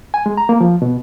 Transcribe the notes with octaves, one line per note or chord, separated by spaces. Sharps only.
G#5
G#3
A#5
A#3
F3
B2